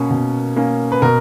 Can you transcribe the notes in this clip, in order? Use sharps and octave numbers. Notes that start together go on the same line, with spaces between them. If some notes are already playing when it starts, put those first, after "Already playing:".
Already playing: B2 A#3 C#4
B2
A#3 C#4
B4
B2 A#4